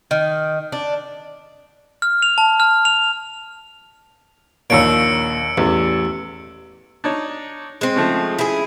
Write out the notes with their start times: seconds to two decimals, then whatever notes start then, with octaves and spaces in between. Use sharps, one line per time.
0.11 D#3
0.72 D4
2.02 F6
2.22 F7
2.38 A5
2.60 F6
2.85 F7
4.70 A#1 D#2 A#2 C#5 E6 C#7 D7
5.58 A1 E2
7.04 D4 D#4 C#5
7.81 G#3 C4
7.96 C#3 F3 A3
8.39 E4 G#4